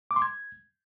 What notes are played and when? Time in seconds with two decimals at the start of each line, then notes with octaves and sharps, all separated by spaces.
0.11 D6
0.16 C6
0.22 G#6